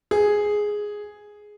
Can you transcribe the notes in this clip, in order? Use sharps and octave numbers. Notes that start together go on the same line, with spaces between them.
G#4